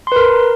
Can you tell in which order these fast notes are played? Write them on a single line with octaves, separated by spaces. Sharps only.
C6 B4 A#4